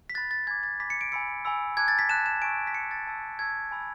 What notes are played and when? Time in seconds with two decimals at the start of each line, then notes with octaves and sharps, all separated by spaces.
0.10 B6
0.15 B5 F#6 A6
0.31 A6
0.47 G#5 B5 D6 G#6
0.63 A6
0.80 G#5 B5 D6 B6
0.90 C#7
1.01 D7
1.12 G#5 B5 E6 C#7
1.45 G#5 B5 E6
1.77 A5 D6 F#6 G#6
1.88 A6
1.99 B6
2.09 A5 D6 F#6 E7
2.26 E7
2.42 G#5 C#6 E6 D7
2.67 B6
2.74 G#5 C#6 E6 C#7
2.91 A6
3.07 A5 C#6 E6
3.39 A5 C#6 E6 G#6
3.71 G#5 B5 E6